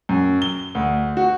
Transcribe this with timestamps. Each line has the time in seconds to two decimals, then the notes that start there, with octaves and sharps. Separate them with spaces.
0.09 F#2
0.42 G7
0.75 D2
1.17 F#4